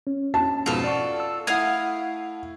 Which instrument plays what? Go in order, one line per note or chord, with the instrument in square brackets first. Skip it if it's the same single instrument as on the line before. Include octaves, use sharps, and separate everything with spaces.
[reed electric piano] C#4
[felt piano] A5
[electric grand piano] F2 G#2 B2 [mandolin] F4 A4
[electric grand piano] D5 F#5 C#6
[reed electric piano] E6
[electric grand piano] A3 E4 [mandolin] F5 D#6 [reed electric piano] F#5 G#6